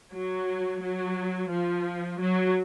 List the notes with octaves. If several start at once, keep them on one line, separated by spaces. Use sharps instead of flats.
F#3
F#3
F3
F#3